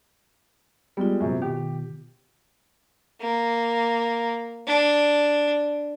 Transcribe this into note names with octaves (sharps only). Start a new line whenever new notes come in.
G3 G#3 B3 F4
F#2 C3
B2 D#3 G4
A#3
D4